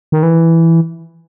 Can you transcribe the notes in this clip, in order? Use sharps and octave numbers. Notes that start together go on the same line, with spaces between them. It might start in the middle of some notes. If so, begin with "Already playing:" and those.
D#3
E3